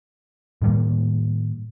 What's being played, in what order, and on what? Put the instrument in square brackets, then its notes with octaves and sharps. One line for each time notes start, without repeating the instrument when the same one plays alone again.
[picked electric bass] A2 D#3 G3 A#3